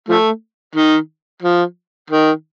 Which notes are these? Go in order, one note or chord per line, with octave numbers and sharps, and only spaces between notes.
F3 A3
D#3
F3
D#3